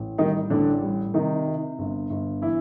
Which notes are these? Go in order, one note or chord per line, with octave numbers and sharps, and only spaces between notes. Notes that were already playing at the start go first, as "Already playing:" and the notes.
Already playing: A1
D#3 G3 D#4
A1 D3 D4
G3
C3 D#3 D#4
C3
G1
G1
E3 E4